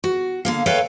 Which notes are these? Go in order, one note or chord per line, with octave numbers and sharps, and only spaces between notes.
F#4
D3 A#3 F5
A4 B4 C#5 E5 F5 G5